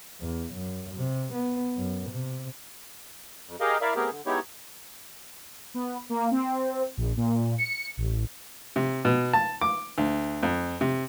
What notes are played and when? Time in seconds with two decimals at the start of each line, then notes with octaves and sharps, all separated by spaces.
0.21 E2
0.54 F#2
0.95 C3
1.33 B3
1.77 F#2
2.10 C3
3.47 F2
3.60 G4 G#4 A#4 D#5 F5
3.81 E4 A#4 D5 E5 F5
3.96 A3 B3 C4 G4 G#4 A#4
4.10 D3
4.26 G#3 B3 D#4 E4 G4 C#5
5.74 B3
6.10 A#3
6.31 C4
6.97 A#1
7.17 A#2
7.58 C#7
7.97 A1
8.76 C3
9.05 B2
9.33 A5
9.61 D6
9.98 D2
10.43 F2
10.81 C3